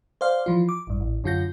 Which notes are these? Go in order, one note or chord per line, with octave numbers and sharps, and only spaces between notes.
C5 D5 F5
E3 F3 F4
D6
A1 G2
A1
F#2 D3 F4 F#4 G6 A#6